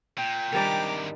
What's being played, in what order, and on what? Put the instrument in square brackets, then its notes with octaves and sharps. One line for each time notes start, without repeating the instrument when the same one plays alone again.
[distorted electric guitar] A#2 [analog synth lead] G5
[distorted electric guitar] G#2 C3 [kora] D#3 G3 D4 [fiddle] A#5 D6